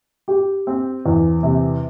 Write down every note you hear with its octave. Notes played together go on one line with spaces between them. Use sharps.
G4
C4
E2
C3